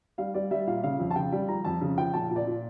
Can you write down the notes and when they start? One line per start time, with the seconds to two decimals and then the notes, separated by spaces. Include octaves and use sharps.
0.18 G3 F5
0.34 G3 D5
0.51 G3 E5
0.67 A#2 F5
0.83 C#3 F5
1.00 F2
1.11 A5
1.16 C#3 G5
1.32 G3
1.48 F3 A#5
1.64 F2 A5
1.81 C#3
1.98 F3 G5
2.13 A#2 A5
2.31 A#2
2.36 D5
2.47 A#2